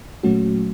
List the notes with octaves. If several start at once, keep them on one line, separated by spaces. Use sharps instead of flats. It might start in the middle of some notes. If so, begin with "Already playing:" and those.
A#2 F#3 A3 C#4 F#4